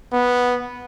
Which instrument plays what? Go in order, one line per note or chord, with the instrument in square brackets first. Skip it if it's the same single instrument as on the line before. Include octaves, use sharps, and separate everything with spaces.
[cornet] B3